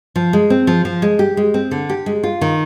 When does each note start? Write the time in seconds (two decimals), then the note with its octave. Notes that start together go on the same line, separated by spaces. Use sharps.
0.16 F3
0.33 G#3
0.50 C4
0.67 F3
0.85 F3
1.02 G#3
1.19 G4
1.37 G#3
1.54 C4
1.71 D3
1.89 G4
2.06 G#3
2.23 F4
2.41 D#3